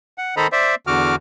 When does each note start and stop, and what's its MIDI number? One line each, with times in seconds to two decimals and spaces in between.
0.18 0.35 78
0.37 0.47 51
0.37 0.47 69
0.37 0.47 72
0.37 0.47 75
0.37 0.47 82
0.37 0.47 83
0.52 0.75 72
0.52 0.75 74
0.52 0.75 76
0.87 1.16 40
0.87 1.16 50
0.87 1.16 66
0.87 1.16 86
0.87 1.16 89